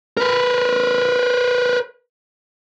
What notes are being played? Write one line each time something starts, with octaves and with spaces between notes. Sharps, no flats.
A#4 B4